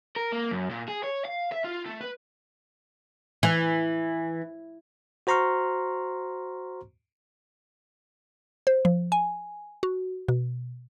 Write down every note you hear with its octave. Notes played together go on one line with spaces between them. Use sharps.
A#4
A#3
F#2
A#2
G#4
C#5
F5
E5
F4
A3
B4
E3
F#4 C5 A#5 C6 C#6 F6
C5
F3
G#5
F#4
B2